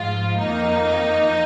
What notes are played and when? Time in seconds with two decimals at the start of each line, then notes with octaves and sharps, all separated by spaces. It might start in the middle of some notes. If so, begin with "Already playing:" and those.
Already playing: G#2 F3 G#3 F4
0.38 F2 D#3 A#3 D#4